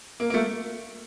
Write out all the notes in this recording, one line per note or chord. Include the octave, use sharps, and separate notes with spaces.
A#3
A#3
A3